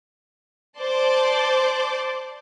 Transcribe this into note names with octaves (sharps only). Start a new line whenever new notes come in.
C5 D5 A5 C6 D6